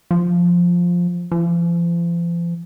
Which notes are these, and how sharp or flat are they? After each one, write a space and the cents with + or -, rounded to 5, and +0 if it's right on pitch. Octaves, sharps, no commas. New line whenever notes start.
F3 +5
F3 -40